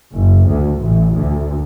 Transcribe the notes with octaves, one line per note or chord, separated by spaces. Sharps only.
F#1
D2
A1
D2